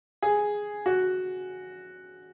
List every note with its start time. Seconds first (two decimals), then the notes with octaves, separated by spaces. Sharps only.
0.22 G#4
0.86 F#4